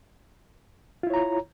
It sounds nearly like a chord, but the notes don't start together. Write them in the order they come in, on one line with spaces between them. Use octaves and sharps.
F4 E4 C#5 A#5